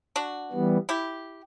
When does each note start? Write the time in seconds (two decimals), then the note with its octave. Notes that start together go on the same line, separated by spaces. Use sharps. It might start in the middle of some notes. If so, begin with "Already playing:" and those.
0.16 D4 F#4
0.52 E3 G3 B3
0.89 E4 G4